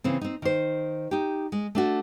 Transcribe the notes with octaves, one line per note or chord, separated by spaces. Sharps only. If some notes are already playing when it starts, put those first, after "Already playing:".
C#3 E3 C4
C4 D#4
D#3 C5
D#4 G4
G#3
A3 D4 F#4